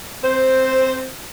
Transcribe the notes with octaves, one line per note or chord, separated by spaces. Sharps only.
C4 C5